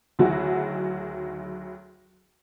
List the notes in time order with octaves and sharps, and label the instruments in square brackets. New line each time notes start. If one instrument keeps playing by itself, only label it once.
[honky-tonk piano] D2 D#3 F#3 E4 F#4 G#4